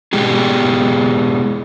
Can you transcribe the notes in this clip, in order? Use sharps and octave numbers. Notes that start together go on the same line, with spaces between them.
B2 G#3 B3 G4 G#4